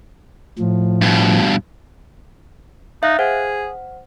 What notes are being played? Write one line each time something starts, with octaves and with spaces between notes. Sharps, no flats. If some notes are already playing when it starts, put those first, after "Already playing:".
A2 F3
G2 B2
D#4 E5 F5 F#6
G#4 C5 F#5